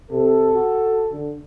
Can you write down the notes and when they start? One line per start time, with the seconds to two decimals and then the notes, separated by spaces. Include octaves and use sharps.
0.11 C3 A4
0.54 F#4
1.12 D3